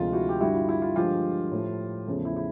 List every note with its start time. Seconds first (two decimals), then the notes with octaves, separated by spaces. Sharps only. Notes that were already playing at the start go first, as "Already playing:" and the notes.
Already playing: D2 C3 F3 G#3 F4
0.13 E4 F#4
0.29 G4
0.41 G2 D3 G3 E4 F#4
0.55 F4
0.69 E4
0.82 F4
0.96 G2 D3 F3 G#3 F4 G4
1.51 A2 F3 A3
2.07 E2 C#3 F3 A3
2.25 E4
2.36 E4